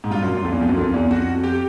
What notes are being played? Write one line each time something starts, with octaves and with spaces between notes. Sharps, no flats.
G#2
G2 F4
F#2
F#2
F2
E2
F2
F#2
F2
E2
F2 F#4
G4